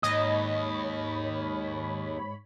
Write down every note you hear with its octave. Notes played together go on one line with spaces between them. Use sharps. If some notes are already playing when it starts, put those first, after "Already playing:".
D#2 G#2 C#5 D#5 B5